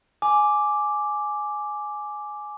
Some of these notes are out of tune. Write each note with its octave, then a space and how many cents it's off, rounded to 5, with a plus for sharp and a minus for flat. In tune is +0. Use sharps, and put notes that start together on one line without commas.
G#5 +10 D6 +0